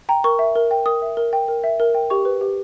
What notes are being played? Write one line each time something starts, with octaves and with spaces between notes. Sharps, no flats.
G5 A#5
A#4 C#6
E5
A#4
G5
A#4 D#6
E5
A#4
G5
A#4
E5
A#4
G5
G4 C#6
B4
G4